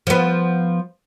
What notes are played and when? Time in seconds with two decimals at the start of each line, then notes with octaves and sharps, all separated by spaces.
0.07 F3 B3